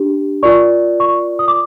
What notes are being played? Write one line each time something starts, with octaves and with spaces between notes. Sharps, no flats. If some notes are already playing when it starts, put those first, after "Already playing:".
Already playing: D4 G4
F4 A#4 D5 C#6
C#6
D#6
D6